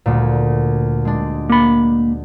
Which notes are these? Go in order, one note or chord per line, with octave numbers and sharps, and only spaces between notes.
D2 A#2
G#3 D4
A#3 B5